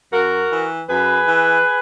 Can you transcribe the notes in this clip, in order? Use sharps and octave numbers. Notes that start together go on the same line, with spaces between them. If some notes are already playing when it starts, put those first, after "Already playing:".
F#2 F#4 A#4
E3
F#2 G#4 B4
E3